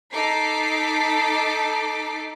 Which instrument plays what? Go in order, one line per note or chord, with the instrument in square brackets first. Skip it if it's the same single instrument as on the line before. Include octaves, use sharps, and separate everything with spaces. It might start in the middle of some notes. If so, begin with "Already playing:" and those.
[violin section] D#4 A4 D6 B6 C7